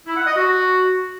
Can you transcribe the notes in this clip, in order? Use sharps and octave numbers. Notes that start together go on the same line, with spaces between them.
E4
F#5
D#5
F#4